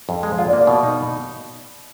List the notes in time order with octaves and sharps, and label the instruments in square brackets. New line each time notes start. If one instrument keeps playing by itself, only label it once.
[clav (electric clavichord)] F2
G#3
[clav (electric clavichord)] F4 [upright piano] F5
[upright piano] D5
[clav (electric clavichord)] A#3
[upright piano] D5
[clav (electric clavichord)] B2
D#4